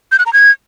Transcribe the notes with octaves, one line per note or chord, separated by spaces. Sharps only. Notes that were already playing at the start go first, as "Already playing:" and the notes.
G6
F#6
A#5
G#6